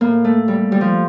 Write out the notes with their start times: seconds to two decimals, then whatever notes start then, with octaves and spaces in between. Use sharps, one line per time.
0.01 A2 A#3
0.24 A3
0.48 G3
0.72 G3
0.81 F3